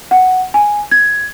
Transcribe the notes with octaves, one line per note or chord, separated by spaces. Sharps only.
F#5
G#5
G#6